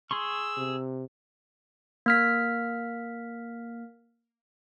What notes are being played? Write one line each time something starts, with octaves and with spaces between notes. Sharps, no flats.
G#4 C6 C#6 E6
C3
A#3 F6 B6